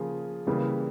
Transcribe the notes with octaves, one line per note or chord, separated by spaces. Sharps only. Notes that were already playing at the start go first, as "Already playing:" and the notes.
Already playing: C#3 F3 A#3 G#4
C#3 E3 G3 A#3